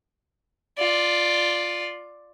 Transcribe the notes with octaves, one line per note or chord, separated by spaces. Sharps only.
F4 D5